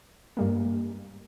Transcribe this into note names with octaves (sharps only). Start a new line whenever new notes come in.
G2 G3 A#3